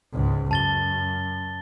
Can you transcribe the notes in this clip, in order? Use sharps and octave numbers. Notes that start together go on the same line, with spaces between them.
C#2 G#2
F#2 A5 A6 G7